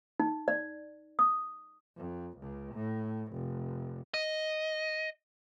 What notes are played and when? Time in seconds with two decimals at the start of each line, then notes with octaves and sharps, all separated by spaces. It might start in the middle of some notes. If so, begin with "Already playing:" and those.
0.20 D#4
0.48 D5
1.19 D#6
1.97 F2
2.38 C#2
2.74 A2
3.32 F1
4.14 D#5